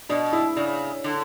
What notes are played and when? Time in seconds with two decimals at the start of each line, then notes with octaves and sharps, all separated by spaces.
0.09 B2 D4
0.33 E4
0.56 C#3 D4
1.04 D3